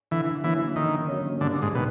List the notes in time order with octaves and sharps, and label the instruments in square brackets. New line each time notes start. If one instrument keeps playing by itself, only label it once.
[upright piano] D3 [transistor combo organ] E3
[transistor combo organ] E3 [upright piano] F#3 A#3 C#4
[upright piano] D3 [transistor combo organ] D#3
[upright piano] F#3 A#3 C#4
[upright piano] G2 [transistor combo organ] D3
[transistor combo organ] G#2
[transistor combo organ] B2 [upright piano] D#3